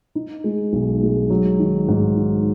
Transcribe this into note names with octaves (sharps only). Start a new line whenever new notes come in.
D#4
G#3
B1
G#3
F#3
D#3
G#2
D#3